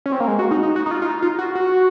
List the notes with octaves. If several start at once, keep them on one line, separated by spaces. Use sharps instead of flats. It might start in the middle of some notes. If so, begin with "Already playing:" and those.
C#4
C4
A#3
G#3
F#4
D#4
D#4
F#4
D#4
F4
F4
D#4
F4
F#4
F#4